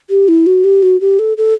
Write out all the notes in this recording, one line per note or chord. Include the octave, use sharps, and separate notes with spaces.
G4
E4
F#4
G4
F#4
G4
A4
A4